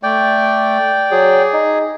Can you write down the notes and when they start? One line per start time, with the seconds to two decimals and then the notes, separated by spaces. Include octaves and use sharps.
0.03 A3 D5 G5
1.11 F#3 G#4
1.53 D#4